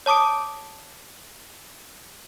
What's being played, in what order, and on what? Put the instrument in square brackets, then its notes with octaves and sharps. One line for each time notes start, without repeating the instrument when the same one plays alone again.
[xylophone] C#5 A5 D6 D#6 D7